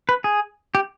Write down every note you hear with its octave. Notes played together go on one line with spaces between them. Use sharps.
B4
G#4
G4